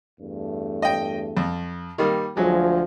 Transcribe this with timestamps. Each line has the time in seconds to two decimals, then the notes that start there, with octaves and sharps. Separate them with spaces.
0.20 E2 G2 A3
0.82 D#5 G5
1.37 F2
1.98 D#3 G3 A#3
2.37 D2 F3 F#3 G#3